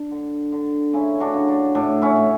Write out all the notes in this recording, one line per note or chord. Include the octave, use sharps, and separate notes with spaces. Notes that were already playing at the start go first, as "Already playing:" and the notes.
Already playing: D4
D3
D3
C#3 C#4 E4
D4 F#4
C#3
D4
A2 D4
C#4 E4
A2